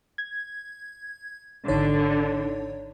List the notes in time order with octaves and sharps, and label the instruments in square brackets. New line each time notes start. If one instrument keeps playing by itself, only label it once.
[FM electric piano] G#6
[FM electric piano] G#1 D#4 C#5 [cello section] D3